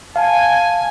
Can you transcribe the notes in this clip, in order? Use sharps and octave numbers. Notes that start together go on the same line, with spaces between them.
F5 G#5 A5